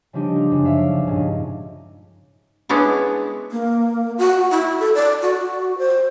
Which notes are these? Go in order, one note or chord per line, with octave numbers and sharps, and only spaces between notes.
C#3 F3 G3 D4 D#4 G4
F4
F#2 C#3 F3
C#5 D5 E5 F5 D6
G1 C#2
G2 A#2 C#3 G#3 C#4 D#4
G#3 B3 C#4 D4 E4
A#3
F#4
E4
A4
D5
F#4
C5